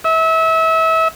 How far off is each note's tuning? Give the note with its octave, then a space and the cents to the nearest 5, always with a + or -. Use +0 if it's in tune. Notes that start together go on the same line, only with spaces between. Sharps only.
E5 -30